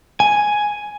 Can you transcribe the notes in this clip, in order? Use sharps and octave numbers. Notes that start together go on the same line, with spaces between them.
G#5